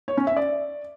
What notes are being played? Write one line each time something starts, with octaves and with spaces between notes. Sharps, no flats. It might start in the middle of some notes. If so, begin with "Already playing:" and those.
C#5
C#4
E5
D5